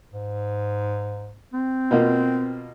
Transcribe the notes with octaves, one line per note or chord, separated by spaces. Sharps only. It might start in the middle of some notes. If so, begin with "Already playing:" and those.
G#2
C4
B2 A#3 F4